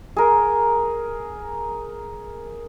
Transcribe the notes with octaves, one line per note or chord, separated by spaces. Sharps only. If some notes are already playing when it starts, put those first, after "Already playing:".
G#4 A#4